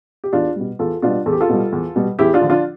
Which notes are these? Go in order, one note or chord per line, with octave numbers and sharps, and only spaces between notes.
G4
E2 D4 F4
B2 G3
E2 F4 A4
B2 G3 D4 F4
E2 A4
G4
F4 A4
B2 G3
E2
B2 G3
E2 E4 G4
D4 F4
D3 F3
D4 F4